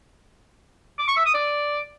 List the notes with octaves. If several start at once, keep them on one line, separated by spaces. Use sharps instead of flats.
D6
C#6
E5
D#6
D5